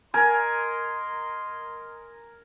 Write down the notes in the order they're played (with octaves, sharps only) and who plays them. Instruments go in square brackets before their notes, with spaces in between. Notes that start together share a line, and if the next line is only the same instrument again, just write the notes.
[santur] A#4 G#5 [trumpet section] D#5 C6